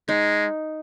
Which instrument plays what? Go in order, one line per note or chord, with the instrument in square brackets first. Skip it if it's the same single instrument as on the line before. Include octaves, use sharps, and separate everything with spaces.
[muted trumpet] G#3 [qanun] D#4